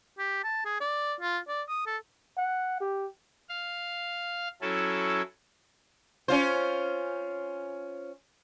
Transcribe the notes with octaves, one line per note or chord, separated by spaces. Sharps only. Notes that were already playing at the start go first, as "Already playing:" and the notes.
G4
A5
G#4
D5
F4
D5
D#6
A4
F#5
G4
F5
F#3 C#4 E4 A4
C#4 F4 C5